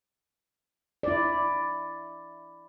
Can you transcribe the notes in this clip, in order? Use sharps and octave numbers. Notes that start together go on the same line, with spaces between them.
E4 D5